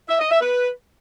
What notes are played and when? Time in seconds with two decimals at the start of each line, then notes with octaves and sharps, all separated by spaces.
0.09 E5
0.20 D#5
0.30 E5
0.41 B4